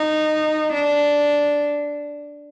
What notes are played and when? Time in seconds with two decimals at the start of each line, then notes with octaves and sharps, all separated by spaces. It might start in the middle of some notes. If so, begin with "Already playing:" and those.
Already playing: D#4
0.74 D4